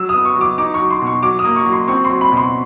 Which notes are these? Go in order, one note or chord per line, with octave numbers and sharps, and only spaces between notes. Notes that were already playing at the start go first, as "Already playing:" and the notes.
Already playing: F#3 E6
D#6
B3
C#6
F#3
D6
D#4 D6
F#3 C#6
C6
B2
C#6
F#3 D6
D#6
A#3
C#6
F#3
C6
C4 C#6
C6
F#3
B5
B2
C6